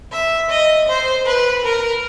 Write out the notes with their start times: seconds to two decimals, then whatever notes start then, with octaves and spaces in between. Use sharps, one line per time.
0.12 E5
0.50 D#5
0.88 C5
1.26 B4
1.64 A#4